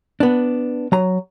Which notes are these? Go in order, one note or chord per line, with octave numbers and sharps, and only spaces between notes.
B3 D4
F#3 A#5